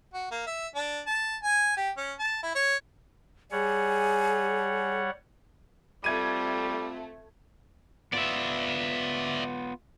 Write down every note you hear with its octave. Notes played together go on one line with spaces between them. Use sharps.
F#4
A#3
E5
D4
A5
G#5
G4
C#4
A5
E4
C#5
G3 G#4 C#5 F#5 G#5
G3 A3 C4 F4 G#6 D#7
B3 F4 D5 E5